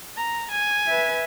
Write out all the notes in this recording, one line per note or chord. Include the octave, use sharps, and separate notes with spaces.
A#5
G#5
B4 E5